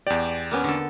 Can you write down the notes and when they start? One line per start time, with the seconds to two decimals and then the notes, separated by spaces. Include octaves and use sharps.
0.07 E2 G4 D5
0.51 A#3 B3 C#4
0.64 D3 A4